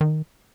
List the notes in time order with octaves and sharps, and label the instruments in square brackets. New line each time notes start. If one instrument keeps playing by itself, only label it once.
[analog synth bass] D#3